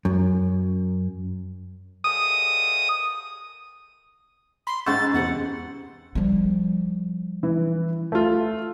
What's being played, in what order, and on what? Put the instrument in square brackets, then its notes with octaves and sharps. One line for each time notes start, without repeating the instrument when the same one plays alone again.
[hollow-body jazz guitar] F#2
[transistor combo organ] D#6
[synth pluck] B5 [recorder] C6
[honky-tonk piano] G#2 E6 [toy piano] C#4 C#6 [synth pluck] C5 F#5 [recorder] A6
[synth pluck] E2 C3 [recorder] F#5
[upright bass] F3 G3
[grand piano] E3
A3 F4